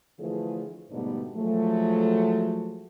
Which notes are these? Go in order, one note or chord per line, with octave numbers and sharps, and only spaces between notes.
D3 E3 F3 A3 G#4
G#2 B2 D3 G3 A3 B3
F3 F#3 G#3 A3